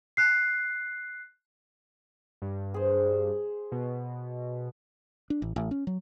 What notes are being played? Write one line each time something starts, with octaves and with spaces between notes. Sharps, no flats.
F#6 C7
G2
G#4 C5
B2
D4
A1
A1
C#4
F#3